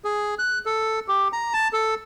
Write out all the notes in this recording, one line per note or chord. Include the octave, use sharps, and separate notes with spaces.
G#4
F#6
A4
G4
A#5
A5
A4